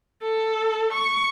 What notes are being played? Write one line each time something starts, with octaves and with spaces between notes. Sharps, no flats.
A4
C#6